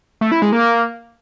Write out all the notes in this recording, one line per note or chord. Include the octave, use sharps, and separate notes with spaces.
A3
E4
G#3
A#3